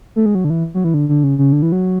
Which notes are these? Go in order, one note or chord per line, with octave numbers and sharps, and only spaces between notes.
A3
G#3
F#3
D3
E3
F#3
E3
D3
D3
C#3
C#3
D3
E3
F#3